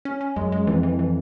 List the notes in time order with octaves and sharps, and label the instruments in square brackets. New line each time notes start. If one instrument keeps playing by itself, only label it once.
[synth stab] C#4
C#4
[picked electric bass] F#2 [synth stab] G#3
[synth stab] G#3
[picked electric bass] F2 [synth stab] E3
[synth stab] E3
E3